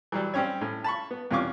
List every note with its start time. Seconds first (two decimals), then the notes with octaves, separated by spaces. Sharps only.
0.12 E3 F#3 G3
0.34 G3 C4 C#4 G4 C#5
0.61 A2 C#4
0.84 A5 B5 C#6
1.11 B3
1.31 E2 C3 C#4 F4 C#6 D6